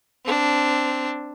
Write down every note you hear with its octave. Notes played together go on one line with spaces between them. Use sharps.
C4 D4